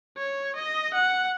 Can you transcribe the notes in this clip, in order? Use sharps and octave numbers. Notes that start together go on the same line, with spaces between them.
C#5
D#5
F#5